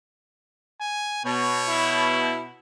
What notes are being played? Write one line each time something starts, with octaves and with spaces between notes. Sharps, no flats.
G#5
B2 C#5
E4